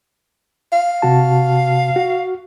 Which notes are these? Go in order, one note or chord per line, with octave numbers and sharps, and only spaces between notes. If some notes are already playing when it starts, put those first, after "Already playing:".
F5
C3 F#4 A5
F#4